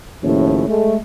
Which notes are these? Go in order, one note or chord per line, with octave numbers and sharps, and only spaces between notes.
D#2 A2 C#3 F3 C#4
G#3 A3